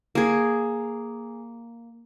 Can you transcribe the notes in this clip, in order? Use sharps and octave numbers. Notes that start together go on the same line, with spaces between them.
A#3 G#4